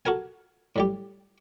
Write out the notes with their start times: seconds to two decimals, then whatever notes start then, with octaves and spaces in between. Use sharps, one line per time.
0.05 F#4 A4 A#4 G#5
0.76 A2 G3 G4